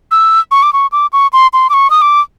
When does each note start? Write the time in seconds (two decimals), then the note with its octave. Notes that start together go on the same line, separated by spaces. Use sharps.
0.11 E6
0.51 C#6
0.63 D6
0.73 C#6
0.92 D6
1.13 C#6
1.33 C6
1.53 C6
1.70 D6
1.74 C#6
1.90 D#6
2.02 D6